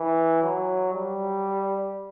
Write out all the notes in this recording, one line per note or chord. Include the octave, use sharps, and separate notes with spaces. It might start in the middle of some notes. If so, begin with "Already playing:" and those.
Already playing: E3
F#3
G3